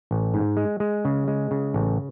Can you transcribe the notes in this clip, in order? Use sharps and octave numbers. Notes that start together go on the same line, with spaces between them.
A1
G#2
G#3
G#3
C#3
G#3
C#3
A1